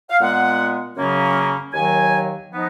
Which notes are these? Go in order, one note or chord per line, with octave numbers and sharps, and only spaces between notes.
F5
A#2 G#3 B3 F#5
F#2 C#3 F#3 A#3 C#4
D#2 D#3 F#3 A#3 G#5
F3 B3 D#4